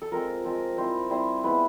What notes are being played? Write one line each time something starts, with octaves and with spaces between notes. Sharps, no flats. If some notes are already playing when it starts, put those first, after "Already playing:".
A4
F3 G#3 C4 A#4
F3 G#3 C4
G3 C4 E4 C5
G3 C4 E4 C5
G#3 B3 E4 B4